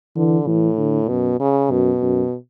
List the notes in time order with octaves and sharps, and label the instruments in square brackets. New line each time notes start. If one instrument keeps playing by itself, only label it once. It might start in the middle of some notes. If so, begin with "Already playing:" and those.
[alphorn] D3 [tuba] E3
[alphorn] A2 [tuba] E3
[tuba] D3
[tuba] F#2 [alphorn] B2
[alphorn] C#3
[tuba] F#2 [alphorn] B2
[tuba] F#2